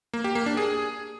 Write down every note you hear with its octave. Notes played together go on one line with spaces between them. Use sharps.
A#3
G4
A#3
D4
G#4